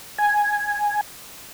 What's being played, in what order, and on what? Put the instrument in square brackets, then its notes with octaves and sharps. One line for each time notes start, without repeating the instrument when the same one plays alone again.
[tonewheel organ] G#5